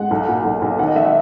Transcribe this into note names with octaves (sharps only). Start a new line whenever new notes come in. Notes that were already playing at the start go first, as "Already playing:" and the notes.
Already playing: G#3 F#5
B1
A#2
B1
B1
D#3 F#5
D#5
G#1 E5
F#5